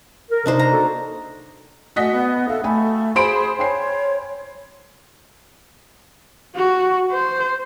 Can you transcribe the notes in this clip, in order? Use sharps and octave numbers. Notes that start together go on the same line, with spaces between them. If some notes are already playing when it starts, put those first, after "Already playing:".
A#4
C3 D4 D#4 C5
A#5
A#3 F#4 A4
A3 F#4 D#5 F#5 G#5 B6
B3
A4 E5 F5
A3 G5 G#5 B5
G#4 C5 F5 G#5 B5 D7
C#5 G5 G#5 C7
F#4
C5